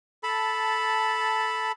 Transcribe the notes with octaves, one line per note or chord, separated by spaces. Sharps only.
A4 A5 B5